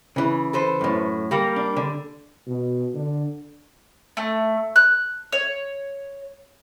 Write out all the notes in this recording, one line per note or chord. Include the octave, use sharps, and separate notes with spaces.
C#3 E3
A4 B4 C5
F#2 A2
G3 A#3
D4
D3
B2
D3
A3
F#6
C#5